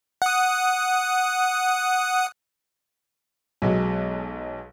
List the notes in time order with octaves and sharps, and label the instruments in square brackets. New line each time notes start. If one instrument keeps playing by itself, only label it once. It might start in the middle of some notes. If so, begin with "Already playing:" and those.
[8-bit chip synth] F#5 D#6
[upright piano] B1 B2 F#3 G#3